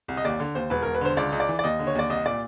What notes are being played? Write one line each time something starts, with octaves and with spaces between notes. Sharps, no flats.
C2
D#5
D#2 D5
D3
D#2 C5
E1 B4
E1 A#4
B4
D3 C5
C#2 D5
C#2 D#5
D5
E3
D5
D#2 D#5
D3
C#5
D#2 D5
C2 D#5
A#2 D5